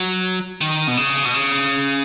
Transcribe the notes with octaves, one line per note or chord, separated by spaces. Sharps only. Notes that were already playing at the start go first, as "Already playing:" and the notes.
Already playing: F#3
D#3
B2
C#3
B2
C#3